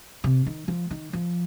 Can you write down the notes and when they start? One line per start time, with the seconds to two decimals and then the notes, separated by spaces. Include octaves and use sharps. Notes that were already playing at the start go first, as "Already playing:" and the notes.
0.24 C3
0.46 D#3
0.68 F3
0.91 D#3
1.13 F3